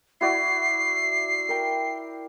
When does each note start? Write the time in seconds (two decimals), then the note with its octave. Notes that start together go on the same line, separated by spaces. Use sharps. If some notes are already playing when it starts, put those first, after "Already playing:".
0.21 E4 F#4 D5 C7
1.49 A#4 G5